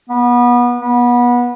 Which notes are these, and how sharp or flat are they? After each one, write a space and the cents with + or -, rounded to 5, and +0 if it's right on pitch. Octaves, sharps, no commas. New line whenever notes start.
B3 -25
B3 -25